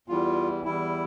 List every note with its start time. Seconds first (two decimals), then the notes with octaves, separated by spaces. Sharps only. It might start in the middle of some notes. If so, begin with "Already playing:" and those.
0.08 E2 E3 G3 F4
0.64 E2 E3 G3 E4